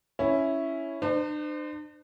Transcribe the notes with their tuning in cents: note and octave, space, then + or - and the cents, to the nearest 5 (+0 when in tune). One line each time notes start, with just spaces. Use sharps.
C#4 +0 E4 +0
D4 +45 C5 -30